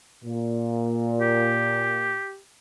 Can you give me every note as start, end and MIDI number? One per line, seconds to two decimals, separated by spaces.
0.24 2.18 46
1.21 2.39 67